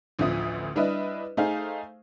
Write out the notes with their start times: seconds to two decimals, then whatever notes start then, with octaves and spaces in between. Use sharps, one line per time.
0.19 A1 D2 D3 F3 E5 D#6
0.76 G3 D4 E4 B4 D#5 E5
1.37 A3 D#4 G#4 C5 F5